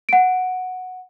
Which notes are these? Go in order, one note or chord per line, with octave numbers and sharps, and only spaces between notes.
F#5 D7